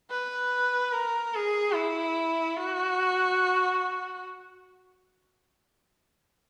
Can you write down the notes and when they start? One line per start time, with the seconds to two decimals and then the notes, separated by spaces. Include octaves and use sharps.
0.11 B4
0.93 A#4
1.34 G#4
1.74 E4
2.57 F#4